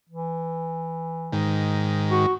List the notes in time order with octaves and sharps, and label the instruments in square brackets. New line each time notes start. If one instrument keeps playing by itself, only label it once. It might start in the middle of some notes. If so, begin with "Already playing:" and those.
[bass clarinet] E3
[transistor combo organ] G#2 D#3
[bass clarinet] F#4